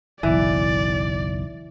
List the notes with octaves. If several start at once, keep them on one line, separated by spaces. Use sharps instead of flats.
F#1 B1 E3 D5